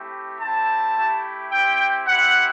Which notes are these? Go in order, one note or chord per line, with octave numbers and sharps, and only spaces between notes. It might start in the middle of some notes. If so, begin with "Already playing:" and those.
Already playing: A3 C4 E4 G4
C4 E4 G4 A5
A3 E4 G4
C4 E4 G4 G5
C4 E4 G4 F#5